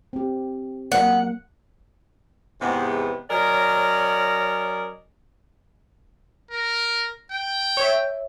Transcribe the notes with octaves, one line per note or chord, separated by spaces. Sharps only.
C4 G4
F#3 A#3 A#4 F#5
E2 G#2 C3 B3
F#3 C#4 A#4 D5 D#5
A#4
G5
C#5 E5